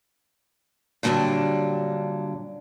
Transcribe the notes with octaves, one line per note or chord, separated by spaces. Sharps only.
G2 A#2 D3 F#3 G3 D4